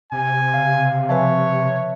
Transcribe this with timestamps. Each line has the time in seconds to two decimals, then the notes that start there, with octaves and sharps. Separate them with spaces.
0.12 C3 G#5
0.54 C#3 F5
1.09 F3 C4 B4 C#5 E5 G#5 A5